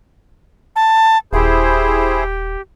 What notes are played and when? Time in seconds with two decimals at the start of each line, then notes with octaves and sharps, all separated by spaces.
0.76 A5
1.33 D#1 E4 G4 G#4 C5